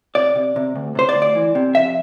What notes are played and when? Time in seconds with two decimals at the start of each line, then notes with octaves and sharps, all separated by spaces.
0.15 C3 D5
0.35 C3
0.56 C3
0.76 D2
0.95 C3 C5
1.09 D5
1.15 D2
1.22 D5
1.35 E3
1.55 C3
1.75 F2 E5